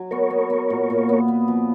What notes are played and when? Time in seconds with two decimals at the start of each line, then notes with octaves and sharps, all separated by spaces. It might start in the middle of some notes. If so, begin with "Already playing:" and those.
Already playing: F#3
0.11 B3 A#4 C#5
0.30 B3
0.50 B3
0.70 A#2
0.90 A#2
1.09 B3
1.28 B3
1.48 F3